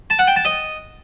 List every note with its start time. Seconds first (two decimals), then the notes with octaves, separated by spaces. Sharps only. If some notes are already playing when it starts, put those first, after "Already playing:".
0.10 A5
0.19 F#5
0.27 G5
0.36 A5
0.45 D#5